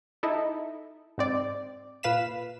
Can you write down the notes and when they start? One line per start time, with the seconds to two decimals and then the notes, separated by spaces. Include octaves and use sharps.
0.23 D#4 E4 A4
1.18 G#2 C4 D5
2.03 A#2 B4 F5 B6 E7